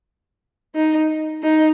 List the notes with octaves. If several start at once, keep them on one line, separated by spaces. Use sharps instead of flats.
D#4
D#4